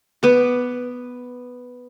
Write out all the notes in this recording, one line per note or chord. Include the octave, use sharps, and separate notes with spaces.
B3 D6